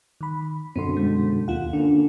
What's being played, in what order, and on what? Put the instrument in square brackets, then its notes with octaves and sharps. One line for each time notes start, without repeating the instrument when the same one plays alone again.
[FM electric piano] D#3 B5
[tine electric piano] F#2 B2 D3 [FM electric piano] C4 C6
[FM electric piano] G#3
[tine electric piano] D#2 [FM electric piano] F4 F#5
[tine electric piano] D3 A#3 C#4 [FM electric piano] D4